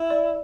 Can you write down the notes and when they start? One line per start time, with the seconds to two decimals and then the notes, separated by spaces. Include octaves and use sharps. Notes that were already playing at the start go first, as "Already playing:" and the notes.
Already playing: E4
0.10 D5